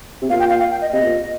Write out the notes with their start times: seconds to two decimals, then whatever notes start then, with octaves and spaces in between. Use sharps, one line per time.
0.22 C3
0.30 A#2 F5
0.40 G5
0.50 F5
0.60 F5
0.71 G5
0.81 D#5
0.93 C3 D#5
1.03 A#2